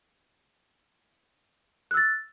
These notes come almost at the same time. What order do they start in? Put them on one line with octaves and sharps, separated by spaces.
F#6 E6 A6